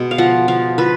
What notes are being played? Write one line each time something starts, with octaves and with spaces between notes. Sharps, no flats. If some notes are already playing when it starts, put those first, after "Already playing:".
Already playing: B2 G#3
F5
F3 F#5
F3 F5
F3 B4